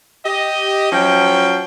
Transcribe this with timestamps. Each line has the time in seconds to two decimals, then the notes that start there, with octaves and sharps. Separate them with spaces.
0.25 G4 D#5
0.92 F3 F#3 C#4 G5